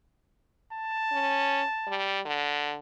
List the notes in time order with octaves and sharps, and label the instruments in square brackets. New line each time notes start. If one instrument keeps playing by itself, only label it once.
[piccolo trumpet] A5
[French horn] C#4
G3
D3